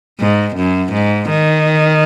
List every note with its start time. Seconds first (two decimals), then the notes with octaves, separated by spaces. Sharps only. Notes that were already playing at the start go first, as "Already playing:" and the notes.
0.20 G#2
0.56 F#2
0.93 G#2
1.30 D#3